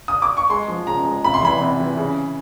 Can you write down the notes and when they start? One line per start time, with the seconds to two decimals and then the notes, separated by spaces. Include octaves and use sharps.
0.08 D#6
0.22 D6
0.37 C#6
0.50 G#3 C6
0.68 F3
0.87 C#3 A#5
1.05 G#3
1.24 C3 B5
1.34 C6
1.42 E3 B5
1.61 C3
1.80 E3
1.97 C#3